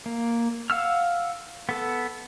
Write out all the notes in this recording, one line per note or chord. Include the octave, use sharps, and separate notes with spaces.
A#3
F5 F#5 E6 F6
B3 A4